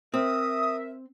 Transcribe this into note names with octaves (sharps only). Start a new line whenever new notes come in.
C4 A#4 E5 D#6